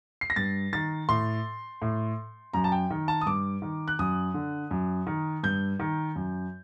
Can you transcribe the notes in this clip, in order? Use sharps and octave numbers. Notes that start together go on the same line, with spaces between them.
C7
A#6
G2 A6
D#3 A6
A2 C6
A2
F#2 A#5
A5
G5
D#3
A5
D#6
G2 D6
D#3
F#6
F#2 D#6
D3
F#2
D#3
G2 G6
D#3
F#2